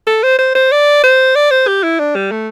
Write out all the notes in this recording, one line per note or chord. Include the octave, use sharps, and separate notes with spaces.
A4
C5
C5
C5
D5
C5
D5
C5
G4
E4
D4
G3
A3